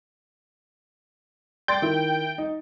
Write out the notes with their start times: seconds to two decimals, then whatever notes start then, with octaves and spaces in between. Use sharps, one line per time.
1.68 D5 G5 C6 A6
1.82 D#3 E4
2.38 D#4